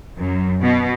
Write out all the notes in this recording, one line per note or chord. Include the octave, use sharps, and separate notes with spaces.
F#2
B2